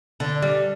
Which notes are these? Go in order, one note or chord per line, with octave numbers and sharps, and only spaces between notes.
D3
G3